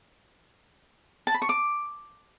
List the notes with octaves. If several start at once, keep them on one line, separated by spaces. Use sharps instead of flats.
A5
B5
C#6
D6